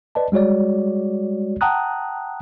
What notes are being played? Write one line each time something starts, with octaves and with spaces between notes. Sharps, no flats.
B4 D5 D#5 A5
G3 G#3 F#4 C#5 D5
F#5 G5 A5 A#5 D#6 F#6